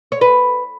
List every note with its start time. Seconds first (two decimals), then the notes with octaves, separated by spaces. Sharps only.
0.12 C#5
0.21 B4